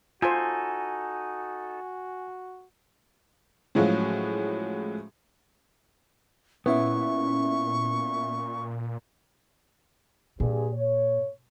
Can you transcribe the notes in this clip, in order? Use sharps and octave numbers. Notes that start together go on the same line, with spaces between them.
D#4 F4 F#4 A4 C5 G#5
A2 F3 F#3 G#3 C#4 F#4
A#2 B3 C#4 E4 E5 C#6
G2 A#2 G4 G#4
C#5